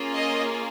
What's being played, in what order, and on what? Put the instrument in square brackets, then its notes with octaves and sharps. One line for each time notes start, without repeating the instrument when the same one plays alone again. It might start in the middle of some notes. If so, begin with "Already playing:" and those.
Already playing: [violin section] A#3 C#4 F4 G#4
D#5